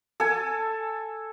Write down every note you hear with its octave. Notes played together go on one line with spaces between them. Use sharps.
A4 G#5